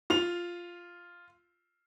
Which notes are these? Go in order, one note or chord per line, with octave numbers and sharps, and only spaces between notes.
F4 F7